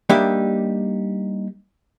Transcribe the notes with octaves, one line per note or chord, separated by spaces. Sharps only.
G3 A#3 D4 D#4 G4 E5